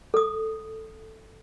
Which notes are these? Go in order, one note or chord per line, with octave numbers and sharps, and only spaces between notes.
A4 D#6